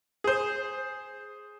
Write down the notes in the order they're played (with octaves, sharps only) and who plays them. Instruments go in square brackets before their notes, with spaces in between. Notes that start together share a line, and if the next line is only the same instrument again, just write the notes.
[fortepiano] G#4 C5